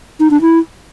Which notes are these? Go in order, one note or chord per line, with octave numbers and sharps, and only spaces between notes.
D#4
D4
E4